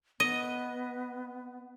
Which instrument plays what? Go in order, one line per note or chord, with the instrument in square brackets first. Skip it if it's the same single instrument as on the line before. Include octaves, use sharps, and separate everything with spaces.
[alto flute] B3 [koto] D#5